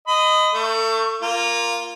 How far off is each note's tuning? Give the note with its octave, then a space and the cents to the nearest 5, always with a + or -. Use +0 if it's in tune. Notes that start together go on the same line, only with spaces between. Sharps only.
D#5 +0 B5 +35
A3 +30 C#6 -5
A#3 +0 F4 +0